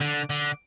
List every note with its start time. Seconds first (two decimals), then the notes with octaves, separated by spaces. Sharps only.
0.01 D3
0.30 D3